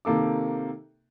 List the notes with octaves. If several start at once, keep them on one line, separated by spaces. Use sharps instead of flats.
C3 D#3 A#3 A4 D6